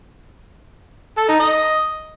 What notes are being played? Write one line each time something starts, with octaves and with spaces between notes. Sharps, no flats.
A4
D#4
D#5